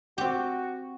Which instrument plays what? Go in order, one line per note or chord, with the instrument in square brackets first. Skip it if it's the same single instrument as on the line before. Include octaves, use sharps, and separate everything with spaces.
[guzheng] C4 G4 [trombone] F#4